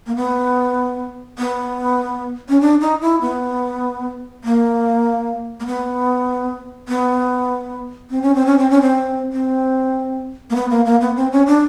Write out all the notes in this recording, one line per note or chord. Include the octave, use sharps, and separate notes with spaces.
A#3
B3
B3
C#4
D4
D#4
E4
B3
A#3
A#3
B3
B3
C4
C#4
C4
C#4
C4
C#4
C4
C4
A#3
B3
A#3
A#3
B3
C4
C#4
D4